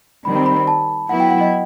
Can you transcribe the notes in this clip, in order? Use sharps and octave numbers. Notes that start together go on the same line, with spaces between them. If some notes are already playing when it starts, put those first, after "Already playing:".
D#3 G3 C4 B5
B5
B5
B5
A5
F#3 B3 E4 F#5
G5
F#5
D#5